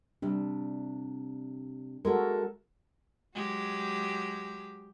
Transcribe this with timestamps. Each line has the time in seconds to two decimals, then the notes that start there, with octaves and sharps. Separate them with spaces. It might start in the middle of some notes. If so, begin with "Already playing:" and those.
0.22 C3 G3 D4
2.05 G#3 A3 B3 F#4 A4 A#4
3.35 F#3 G#3 G4